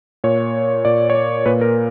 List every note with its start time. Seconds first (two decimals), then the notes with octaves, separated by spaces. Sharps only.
0.24 A#2 C#5
0.85 A#2 D5
1.10 C#5
1.15 D5
1.46 A#2 B4
1.61 A#4